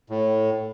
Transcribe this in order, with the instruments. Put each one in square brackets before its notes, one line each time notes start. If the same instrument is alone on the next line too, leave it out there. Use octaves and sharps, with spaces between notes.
[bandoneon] A2